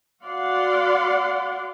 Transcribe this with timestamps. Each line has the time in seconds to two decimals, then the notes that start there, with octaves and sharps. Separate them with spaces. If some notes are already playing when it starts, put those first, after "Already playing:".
0.24 F#4 D5 F5 F#5 C6